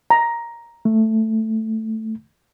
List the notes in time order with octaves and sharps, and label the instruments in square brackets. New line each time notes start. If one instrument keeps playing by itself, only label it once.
[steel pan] A#5
[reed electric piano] A3